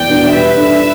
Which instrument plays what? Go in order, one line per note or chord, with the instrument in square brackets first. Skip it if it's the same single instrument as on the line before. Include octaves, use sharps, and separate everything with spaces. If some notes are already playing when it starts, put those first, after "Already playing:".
Already playing: [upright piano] E2 [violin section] D5 G5
[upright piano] B2 B3 D4
[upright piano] G3 [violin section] B4 E5
[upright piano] D4 A4